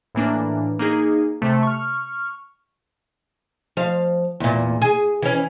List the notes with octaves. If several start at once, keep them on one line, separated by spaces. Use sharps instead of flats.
A2 E3 A#3 D4
A#3 D#4 G#4
C3 A3
C#6 F6
F3 F5
E2 A#2
G#4
E3 C#4